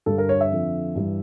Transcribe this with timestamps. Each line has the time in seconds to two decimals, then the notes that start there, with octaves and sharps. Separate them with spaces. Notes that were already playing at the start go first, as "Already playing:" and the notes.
0.06 G2 D3 G3 A4
0.18 A#4
0.29 C#5
0.41 E5
0.51 F2 D3 F3
0.95 G2 E3 G3